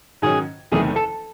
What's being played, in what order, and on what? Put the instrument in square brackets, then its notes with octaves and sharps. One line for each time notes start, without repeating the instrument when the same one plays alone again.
[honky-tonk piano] G#2 D#3 F#3 C#4 [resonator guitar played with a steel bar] G#4
[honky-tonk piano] F#1 E2 C3 D#3 A3 [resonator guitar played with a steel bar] G#4
[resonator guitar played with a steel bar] A4